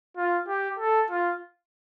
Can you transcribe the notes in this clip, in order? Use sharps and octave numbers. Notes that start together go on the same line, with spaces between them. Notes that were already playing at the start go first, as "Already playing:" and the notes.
F4
G4
A4
F4